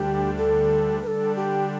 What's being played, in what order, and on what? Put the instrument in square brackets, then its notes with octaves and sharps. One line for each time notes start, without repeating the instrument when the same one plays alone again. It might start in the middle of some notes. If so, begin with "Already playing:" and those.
Already playing: [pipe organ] D2 D3 G3 D4 [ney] G4
[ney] A4
[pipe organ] D3 G3 D4 [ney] A4 B4
[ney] G4